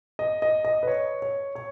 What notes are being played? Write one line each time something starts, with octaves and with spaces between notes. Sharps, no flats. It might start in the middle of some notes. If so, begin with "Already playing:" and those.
D#5
D#5
D#5
B4
C#5
C#5
C#5